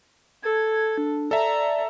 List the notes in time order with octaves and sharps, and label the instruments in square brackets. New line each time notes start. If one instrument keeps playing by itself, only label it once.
[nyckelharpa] A4 [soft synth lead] G#6
[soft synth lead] D4
[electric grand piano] A4 E5 [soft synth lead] D5 [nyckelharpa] A#5